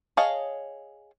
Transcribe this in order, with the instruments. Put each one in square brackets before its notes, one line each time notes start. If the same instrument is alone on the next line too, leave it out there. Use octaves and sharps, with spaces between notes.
[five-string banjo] G#4 C#5 D#5 F5 A5